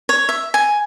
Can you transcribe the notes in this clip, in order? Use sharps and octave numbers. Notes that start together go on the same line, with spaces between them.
C#5
E5
G#5